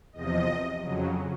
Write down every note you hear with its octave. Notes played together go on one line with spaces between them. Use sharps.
E2 C3 F3 D#5
F2 C#3 F#3